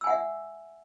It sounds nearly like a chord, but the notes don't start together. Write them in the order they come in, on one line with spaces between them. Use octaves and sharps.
E6 G#5 F#5 E5